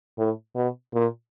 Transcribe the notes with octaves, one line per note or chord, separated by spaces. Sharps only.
A2
B2
A#2